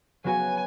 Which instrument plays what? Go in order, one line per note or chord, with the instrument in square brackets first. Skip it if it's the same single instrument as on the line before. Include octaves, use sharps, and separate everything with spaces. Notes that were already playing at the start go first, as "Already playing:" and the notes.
[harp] F#3 B3 F#4 [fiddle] G#5